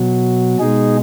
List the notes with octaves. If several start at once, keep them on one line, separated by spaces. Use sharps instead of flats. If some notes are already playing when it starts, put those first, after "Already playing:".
Already playing: B2 F#3
B2 G#3 D#4 G#4